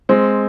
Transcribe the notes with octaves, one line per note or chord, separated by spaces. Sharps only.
G#3 C4